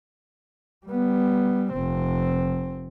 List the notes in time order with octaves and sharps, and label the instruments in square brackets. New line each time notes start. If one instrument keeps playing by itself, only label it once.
[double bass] G3 B3
F1 C4